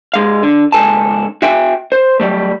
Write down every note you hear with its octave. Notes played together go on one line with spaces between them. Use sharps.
G#2 G#3 F5
D3
C#2 G#2 B3 A4 G#5 A5
F#4 E5 G5 G#5
C5
F#3 G3 A3